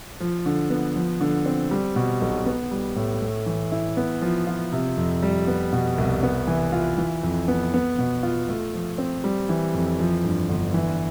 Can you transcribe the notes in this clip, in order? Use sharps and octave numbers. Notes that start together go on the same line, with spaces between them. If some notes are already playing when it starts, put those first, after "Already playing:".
F3
D3
B3
F3
D3
C4
G3
B2
B1
B3
G3
A2
A3
E3
E4
B3
F3
F4
C3
F2
G3
B3
B2
C2
B3
E3
F4
E3
F2
B3
B3
B2
F4
A3
F3
C4
G3
E3
F2
F3
G2
G1
E3